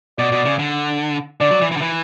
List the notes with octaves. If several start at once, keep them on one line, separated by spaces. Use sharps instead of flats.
B2 D5
B2
C#3
D3
D3 D5
F#3
E3
E3
D3
E3